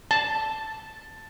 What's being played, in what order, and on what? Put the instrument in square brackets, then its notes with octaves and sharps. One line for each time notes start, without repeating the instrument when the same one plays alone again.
[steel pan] A5